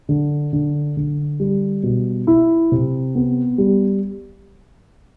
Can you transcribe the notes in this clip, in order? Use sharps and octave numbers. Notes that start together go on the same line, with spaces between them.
D3
D3
D3
G3
B2
E4
C3
B3
G3